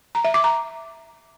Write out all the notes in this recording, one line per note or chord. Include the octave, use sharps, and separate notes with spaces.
A#5
E5
D6
A#5